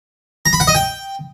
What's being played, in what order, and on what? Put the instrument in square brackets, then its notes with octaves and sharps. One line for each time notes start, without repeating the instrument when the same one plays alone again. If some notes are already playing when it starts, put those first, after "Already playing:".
[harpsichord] A#5
B5
F#5
D#5
G5